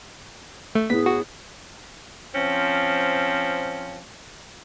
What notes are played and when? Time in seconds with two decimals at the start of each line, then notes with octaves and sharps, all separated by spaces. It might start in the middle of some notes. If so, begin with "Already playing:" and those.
0.75 A3
0.90 A2 B3 G#4 B6
1.06 F#4
2.35 F3 C4 C#4